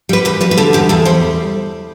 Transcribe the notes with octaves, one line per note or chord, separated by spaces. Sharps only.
G3 B4
E2 B4
G3 B4
B4
D3 A4
E2 G4
E2 A4
G3 C5